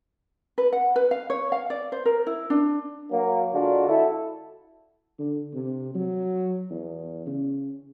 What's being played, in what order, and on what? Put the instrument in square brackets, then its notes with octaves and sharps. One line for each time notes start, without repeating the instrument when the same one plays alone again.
[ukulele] B4
F#5
B4
F5
C#5
F5
D5
C5
A#4
E4
D4
[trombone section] F#3 A#3
D3 G#3 D4 F4 F#4
E4 F#4 A4
[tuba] D3
C3
F#3
E2
C#3